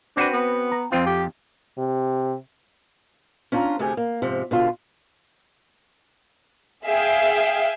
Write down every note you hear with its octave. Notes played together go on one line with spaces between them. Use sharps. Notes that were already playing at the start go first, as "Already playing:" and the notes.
C4 D4 F#4 B4
B3
A#5
F2 C4 F4
G4
C3
C#4 D4 F4 G5 A#5
D2 C3 A3 G4 G#4 G#5
A#3
G#2 C3 F3
B2 D3 F4
G#4 E5 F5 G5